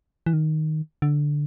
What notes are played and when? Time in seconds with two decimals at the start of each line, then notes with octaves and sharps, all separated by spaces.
0.26 E3
0.33 D#3
1.02 D3